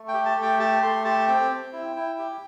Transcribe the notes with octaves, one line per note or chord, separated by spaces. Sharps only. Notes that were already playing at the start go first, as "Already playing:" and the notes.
Already playing: A3
G5
G4
A5
A3
G5
G4 A5
A3 C6
G4 A5
C4 G5
C4
E4
E4
G4